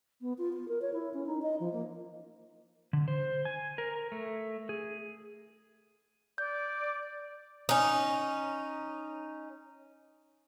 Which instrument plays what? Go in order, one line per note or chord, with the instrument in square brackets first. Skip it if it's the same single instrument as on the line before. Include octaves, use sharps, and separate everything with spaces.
[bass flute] B3
F4
F4
A#4
C#5
E4
C#4
D#4
D#5
F3
A#3
[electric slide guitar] D3
C5
G#5
A#4
A3
G#4
[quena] D5 [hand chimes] G6
[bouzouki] C#4 D#4